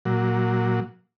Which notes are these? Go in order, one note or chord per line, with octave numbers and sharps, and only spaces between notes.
A#2 F#3